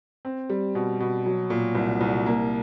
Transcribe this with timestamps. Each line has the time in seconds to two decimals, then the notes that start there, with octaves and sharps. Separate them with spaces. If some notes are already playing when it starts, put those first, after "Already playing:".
0.25 C4
0.50 G3
0.75 B2
1.00 B2
1.26 F#3
1.50 A#2
1.75 C2
2.01 C2
2.26 A#3